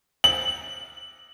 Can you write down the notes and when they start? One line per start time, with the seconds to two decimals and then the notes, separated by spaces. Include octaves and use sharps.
0.24 F#7